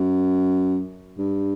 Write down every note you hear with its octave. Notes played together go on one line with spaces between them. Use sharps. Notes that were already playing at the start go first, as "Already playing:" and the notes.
Already playing: F#2
G2